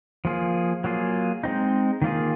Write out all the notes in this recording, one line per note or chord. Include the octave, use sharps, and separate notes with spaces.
F3 A#3 F4 G#4
F#3 A#3 F4 G#4
G#3 C4 D#4
D#3 A#3 F4 G#4